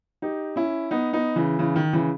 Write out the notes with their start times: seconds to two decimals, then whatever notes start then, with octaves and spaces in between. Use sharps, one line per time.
0.22 D#4 G4
0.56 C#4 E4
0.91 B3 D#4
1.13 B3 D#4
1.36 C#3 E3
1.59 C#3 E3
1.76 D#3
1.93 C#3 E3